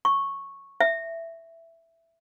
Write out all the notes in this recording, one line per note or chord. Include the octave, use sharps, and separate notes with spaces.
C#6
E5